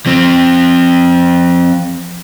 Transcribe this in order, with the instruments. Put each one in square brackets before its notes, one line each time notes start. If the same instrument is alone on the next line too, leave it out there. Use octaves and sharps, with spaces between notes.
[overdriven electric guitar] F3 C4